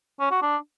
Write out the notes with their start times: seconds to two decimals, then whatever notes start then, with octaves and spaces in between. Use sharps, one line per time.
0.20 C#4
0.31 F#4
0.42 D4